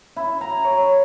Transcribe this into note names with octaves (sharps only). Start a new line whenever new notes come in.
E4
A#5
C#5